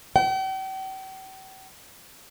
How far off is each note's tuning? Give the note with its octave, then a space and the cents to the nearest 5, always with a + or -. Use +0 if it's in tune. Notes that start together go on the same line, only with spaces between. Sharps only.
G5 -45